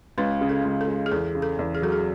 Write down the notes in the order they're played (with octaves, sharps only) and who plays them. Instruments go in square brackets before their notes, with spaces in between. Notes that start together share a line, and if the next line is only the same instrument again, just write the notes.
[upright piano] C#2 [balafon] B4
[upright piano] C#3
[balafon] A4
[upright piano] C#2
[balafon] A4
[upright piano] G#3
[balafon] G#4
[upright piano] E2 [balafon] A4
[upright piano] C#3
[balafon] A4
[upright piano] E2
[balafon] G#4
[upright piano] F#3 [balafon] A4
[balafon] G#4